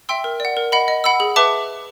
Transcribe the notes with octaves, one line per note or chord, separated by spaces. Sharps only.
E5 G5 C6 E6
A#4
D5 F#5
A#4
D#5 F#5 B5
D#5
F#5 B5 E6
G#4
B4 E5 A5 D6